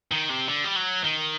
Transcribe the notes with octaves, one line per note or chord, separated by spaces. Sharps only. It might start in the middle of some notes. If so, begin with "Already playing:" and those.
D#3
C3
D3
G3
F#3
D#3